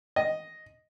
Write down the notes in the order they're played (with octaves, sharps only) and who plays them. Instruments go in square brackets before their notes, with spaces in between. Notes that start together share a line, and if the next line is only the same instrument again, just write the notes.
[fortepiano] D#5